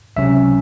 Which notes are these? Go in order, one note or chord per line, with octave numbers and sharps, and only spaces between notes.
C#2 C3 F#3 C#4 E5